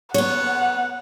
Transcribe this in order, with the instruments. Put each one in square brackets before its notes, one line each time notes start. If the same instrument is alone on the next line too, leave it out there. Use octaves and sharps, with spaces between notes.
[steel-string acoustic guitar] B3 C#5 [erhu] F#5